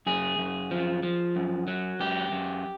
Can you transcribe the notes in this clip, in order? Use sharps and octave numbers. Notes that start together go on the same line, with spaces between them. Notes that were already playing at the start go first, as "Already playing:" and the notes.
F#2 G#4
F#2
F3
F3
F#2
F#3
F#2 G4
F#2